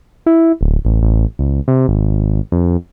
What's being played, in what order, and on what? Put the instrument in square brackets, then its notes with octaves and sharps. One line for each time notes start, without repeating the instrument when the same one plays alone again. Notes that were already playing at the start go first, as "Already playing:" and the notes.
[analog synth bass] E4
D1
A1
A1
C#2
C3
G#1
F2